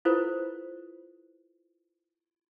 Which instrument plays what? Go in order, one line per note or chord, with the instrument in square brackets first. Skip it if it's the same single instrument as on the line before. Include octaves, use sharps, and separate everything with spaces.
[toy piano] E4 F4 A4 B4 C5